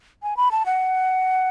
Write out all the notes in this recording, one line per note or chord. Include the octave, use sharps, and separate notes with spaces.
G#5
B5
A5
F#5